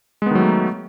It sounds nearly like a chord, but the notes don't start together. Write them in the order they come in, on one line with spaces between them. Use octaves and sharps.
G#3 B3 D#3 F#3 A3